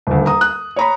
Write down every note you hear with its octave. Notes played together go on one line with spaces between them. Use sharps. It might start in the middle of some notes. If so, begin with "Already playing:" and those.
D#1 D2
A#5 D#6
F#6
C#5 A#5 B5